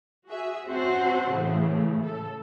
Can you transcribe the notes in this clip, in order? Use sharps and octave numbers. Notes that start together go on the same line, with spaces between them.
F#4 G#4 E5
C4 C#4 F#4 C5 F#5 A5
A2 C#3 E3 A3
A4